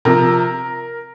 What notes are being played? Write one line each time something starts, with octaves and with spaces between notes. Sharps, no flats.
C3 F3 A#4